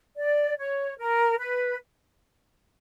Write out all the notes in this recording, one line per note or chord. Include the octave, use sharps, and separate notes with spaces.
D5
C#5
A#4
B4